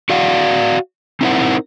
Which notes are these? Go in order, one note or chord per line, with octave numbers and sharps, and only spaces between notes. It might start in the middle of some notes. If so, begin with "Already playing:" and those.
F#4 D5 F5 F#5
C4 D#4 E4 A#4 C5 F#5